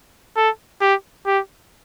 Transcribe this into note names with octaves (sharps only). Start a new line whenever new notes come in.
A4
G4
G4